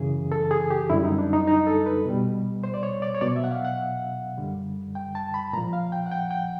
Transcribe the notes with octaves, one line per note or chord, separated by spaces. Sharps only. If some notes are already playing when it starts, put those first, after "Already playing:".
Already playing: F#2 C#3 E3 G#4
A4
G#4
G4
F#2 D3 G3 E4
D#4
D4
D#4
D#4
A4
B4
B2 G3
C5
D5
C#5
D5
C#5
B2 F#3 D5
E5
F#5
F5
F#5
F#2 D3 G3
G5
A5
B5
A#2 F3 A#5
F5
G5
F#5
G5
G5